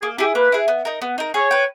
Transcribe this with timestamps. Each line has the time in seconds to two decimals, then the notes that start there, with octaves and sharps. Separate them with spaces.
0.02 A#3 G#4
0.18 E4 G4 G#4
0.35 A#3 B4
0.52 E4 G#4
0.68 B3
0.85 D#4 A#4
1.02 B3
1.18 D#4 A#4
1.34 G#4 C#5
1.51 B4 G5